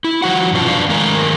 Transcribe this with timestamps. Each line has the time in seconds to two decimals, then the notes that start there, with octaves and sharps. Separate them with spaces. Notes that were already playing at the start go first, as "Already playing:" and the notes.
0.04 E4
0.22 D#3 F3 F#4 F#5
0.53 G2 B2 C#4 F4 A5
0.68 F2 D4 D5 F5
0.89 D#3 G#3 A3 A#4 G#5 A#5